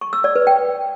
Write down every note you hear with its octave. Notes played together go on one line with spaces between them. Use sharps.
C#6
E6
D5
B4
G5